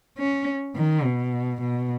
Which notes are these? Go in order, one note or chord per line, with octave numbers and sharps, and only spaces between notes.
C#4
D#3
B2
B2